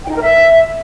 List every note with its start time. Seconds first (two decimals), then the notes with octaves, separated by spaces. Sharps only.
0.04 G5
0.09 D#4
0.15 A#4
0.21 E5